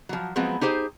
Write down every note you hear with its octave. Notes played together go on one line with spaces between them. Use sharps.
F3 F#3
F3 F#3 G#3 B3 C4
D#4 G4 G#4 C5